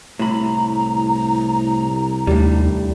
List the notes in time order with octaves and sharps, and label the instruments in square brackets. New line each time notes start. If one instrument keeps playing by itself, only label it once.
[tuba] C2 [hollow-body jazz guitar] A2 B5 [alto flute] A#5
[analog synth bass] D#2 [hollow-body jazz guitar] A2 G3 [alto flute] D4